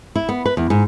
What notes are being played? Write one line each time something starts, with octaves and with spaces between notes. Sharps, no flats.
E4
B3
B4
E2
G#2